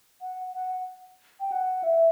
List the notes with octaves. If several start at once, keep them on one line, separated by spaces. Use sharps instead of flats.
F#5
F#5
G5
F#5
E5